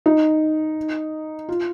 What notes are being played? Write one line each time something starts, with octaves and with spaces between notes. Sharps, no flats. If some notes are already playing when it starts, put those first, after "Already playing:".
D#4
F4